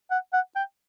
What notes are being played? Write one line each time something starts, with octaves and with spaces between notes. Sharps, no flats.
F#5
F#5
G5